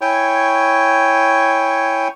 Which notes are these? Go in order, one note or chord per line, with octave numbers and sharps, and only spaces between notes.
E4 C#5 G5 G#5 C#6